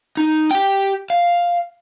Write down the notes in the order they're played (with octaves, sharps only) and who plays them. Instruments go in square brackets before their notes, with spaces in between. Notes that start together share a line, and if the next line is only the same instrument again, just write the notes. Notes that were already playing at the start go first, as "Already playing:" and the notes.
[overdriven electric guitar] D#4
G4 G5
F5